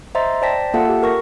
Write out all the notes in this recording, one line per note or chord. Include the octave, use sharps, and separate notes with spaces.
C5 D#5 E5 A#5 C6 A6
C5 D5 G5 A5 A#6 B6
A#3 F4 A4 E5 F#5 A5
G4
A#4 C#6 A#6